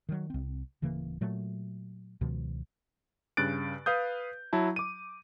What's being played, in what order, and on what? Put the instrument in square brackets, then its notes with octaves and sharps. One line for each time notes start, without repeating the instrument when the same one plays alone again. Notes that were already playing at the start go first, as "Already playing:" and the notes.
[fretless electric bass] D#3 F#3
C2 C4
D1 C#3 E3 A#3
A#2 F#3 A3
C#2 B2 D#3 F3
[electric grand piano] G2 C#3 F#6 A6 D7
B4 F5 D#6 G6
F#3 E4 A5
D6 D#7